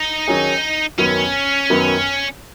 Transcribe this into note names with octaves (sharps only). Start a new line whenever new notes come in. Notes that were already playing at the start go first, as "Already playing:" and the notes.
Already playing: D#4
D#3 F#3 C#4 G#4
F#2 D#3 F#3 B3 C#4
F#2 D#3 F#3 B3